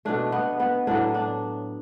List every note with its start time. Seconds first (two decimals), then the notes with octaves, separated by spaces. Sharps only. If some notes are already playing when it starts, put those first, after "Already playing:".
0.05 B2 A3 D4
0.32 B3
0.60 B3
0.87 A2 F#3 B3 D4
1.14 D4